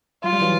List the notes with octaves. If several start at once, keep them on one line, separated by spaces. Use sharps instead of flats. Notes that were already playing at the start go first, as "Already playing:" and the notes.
F#3 F4
G3
E3 F#3